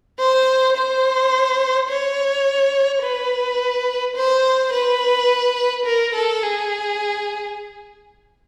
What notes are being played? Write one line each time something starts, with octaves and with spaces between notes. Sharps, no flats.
C5
C5
C#5
B4
C5
B4
A#4
A4
G#4